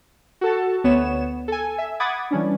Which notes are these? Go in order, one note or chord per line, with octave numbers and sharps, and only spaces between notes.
F#4 A4 A5
D2 B3 C#5 E7
A4 G#5
E5
F#5 B5 D6 D#6 G#6 A6
E3 G3 C#4 D4